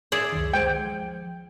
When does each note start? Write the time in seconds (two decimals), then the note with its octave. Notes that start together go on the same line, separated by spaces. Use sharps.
0.12 G#4 D5 E5
0.33 C#2 F#2 D#3
0.54 G#3 C5 G5 G#6
0.85 F3